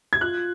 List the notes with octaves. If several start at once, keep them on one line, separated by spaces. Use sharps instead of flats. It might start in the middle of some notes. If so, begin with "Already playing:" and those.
G#6
F4 F#6